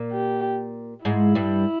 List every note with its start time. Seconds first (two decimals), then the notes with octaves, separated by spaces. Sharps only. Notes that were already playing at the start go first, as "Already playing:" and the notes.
Already playing: A#2 A#3
0.12 G4
1.05 G#2 G#3 E4
1.35 G2 G3